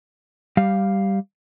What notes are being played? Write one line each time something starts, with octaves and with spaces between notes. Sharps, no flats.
G3 G4 F5